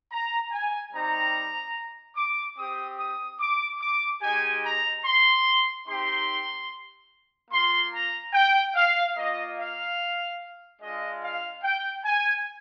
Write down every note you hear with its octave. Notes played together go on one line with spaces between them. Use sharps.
A#5
G#5
G3 C4 D#4 G4 A#5
D6
C4 G4 D#6
D#6
D6
D6
G#3 D#4 G4 G#5
A#5
C6
C4 D#4 G4 C6
A#3 F4 C6
A#5
G5
F5
A#3 F4 D#5
F5
G#3 D4 F4 D#5
F5
G5
G#5